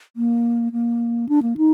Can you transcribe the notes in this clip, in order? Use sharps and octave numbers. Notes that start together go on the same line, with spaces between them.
A#3
A#3
D4
A#3
D#4